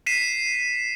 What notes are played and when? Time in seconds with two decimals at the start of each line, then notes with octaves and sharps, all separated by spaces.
0.06 B6 C7 D#7 E7